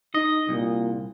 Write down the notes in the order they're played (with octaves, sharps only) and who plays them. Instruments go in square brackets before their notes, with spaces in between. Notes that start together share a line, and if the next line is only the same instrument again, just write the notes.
[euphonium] D#4 [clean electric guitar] D#5
[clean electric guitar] C2 [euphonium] A#2